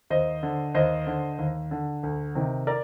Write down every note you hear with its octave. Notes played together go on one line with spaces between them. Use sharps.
D#2 C5 D#5
D3
D#2 C5 D#5
D3
D#2
D3
D2
C3 D#3
A#4 D5